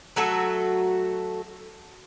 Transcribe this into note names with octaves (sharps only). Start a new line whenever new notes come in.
F#3 A3 F#4 A4